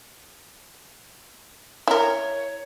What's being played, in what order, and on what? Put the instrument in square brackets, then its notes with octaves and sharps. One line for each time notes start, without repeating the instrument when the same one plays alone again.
[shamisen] E4 A#4 [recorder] C#5